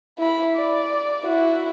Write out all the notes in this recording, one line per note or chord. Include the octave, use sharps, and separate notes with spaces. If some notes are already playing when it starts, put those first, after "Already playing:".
E4 B5
D5
E4 F#4